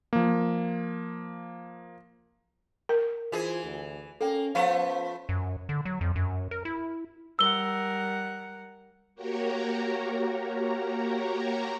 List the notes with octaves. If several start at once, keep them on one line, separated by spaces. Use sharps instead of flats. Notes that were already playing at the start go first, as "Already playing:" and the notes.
F3 A#3
A#4
E3 F4 G#4 C5
D2
A#3 C#4 A4 G5
F3 A3 B3 C#4 B4 C5 F5
F#2
D3
F#3
F2
F#2
A#4
E4
G3 A#4 F#5 E6 G7
A#3 F#4 G4 A#4 C#5 A#5